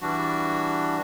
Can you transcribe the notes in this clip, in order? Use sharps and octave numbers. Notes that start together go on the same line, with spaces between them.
E3 G3 D4 F#4